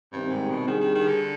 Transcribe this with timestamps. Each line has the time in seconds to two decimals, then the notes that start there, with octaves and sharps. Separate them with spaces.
0.12 G2 C3 D#3 G3 C4
0.31 G#2
0.49 B2
0.67 D#3 G3 D4 G#4
0.80 D#3
0.94 D#3
1.08 D3